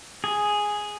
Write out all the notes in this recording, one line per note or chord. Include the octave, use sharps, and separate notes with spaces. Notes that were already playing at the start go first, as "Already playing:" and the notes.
G#4